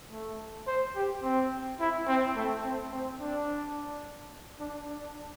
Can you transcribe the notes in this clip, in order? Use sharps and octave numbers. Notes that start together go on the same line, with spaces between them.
A3
C5
G4
C4
E4
C4
A3
C4
C4
D4
D4
D4